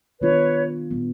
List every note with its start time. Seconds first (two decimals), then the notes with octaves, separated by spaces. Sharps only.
0.20 D#3 G3 B3 D4 F4 B4 C#5
0.91 A#2 G3 B3